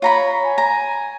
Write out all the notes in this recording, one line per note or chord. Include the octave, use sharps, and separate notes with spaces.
F4 C#5 A#5 B5
G#5
A#5